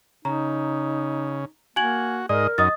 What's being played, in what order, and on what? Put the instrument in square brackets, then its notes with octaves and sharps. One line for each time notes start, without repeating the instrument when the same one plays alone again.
[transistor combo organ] C#3 [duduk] D#4 [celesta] A#5
[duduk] A#3 [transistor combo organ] F#4 [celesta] G#5 G#6 F#7
[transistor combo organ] G#2 D#4 D#5 [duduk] A#4 [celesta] D5
[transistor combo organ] F#2 D#4 [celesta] D#5 D#6 A6